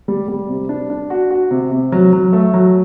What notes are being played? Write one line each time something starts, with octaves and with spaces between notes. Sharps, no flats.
G3
G3
C3
D4
D4
F#4
F#4
C3
C3
F#3
F#3
A3
F#3